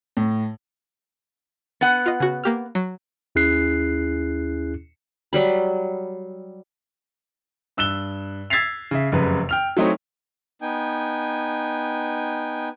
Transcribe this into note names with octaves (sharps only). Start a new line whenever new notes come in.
A2
B3 F#5
F4 D#5
C#3 F#4
A#3 G4 F6
F#3
D#2 C#4 E4 G#4 F#6 C7
F#3 G3 B5
G2 E6 F#6 E7 G7
E6 G#6 A6 B6 C7 F7
C#3 E5
F1 F#2 C#3 B4
G5 F6 F7
F#3 A3 C4 D#4 E4 C#5
B3 D#4 G5 G#5